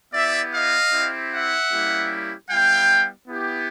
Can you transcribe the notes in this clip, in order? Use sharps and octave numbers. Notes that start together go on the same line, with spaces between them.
B3 E4 G4 D5 E5
D#5 F5
C4 E4 G4
E5 F#5
G3 A#3 C#4 E4 G4
G3 B3 E4 F5 G5
B3 E4 G4